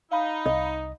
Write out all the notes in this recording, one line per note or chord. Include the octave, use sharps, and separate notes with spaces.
D#4 F5 B5
C2 D#5